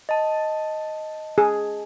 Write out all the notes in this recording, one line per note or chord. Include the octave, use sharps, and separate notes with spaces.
D#5 A5
G#4